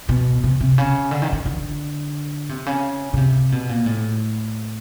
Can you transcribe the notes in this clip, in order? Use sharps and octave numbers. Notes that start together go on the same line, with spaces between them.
B2
C3
C3
C#3
D3
D#3
D3
D3
C3
C#3
C#3
C3
B2
A#2
A2